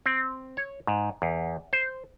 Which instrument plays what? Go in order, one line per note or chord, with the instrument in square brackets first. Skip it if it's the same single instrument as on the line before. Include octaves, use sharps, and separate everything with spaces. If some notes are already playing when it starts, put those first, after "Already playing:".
[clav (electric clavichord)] C4
C#5
G#2
E2
C5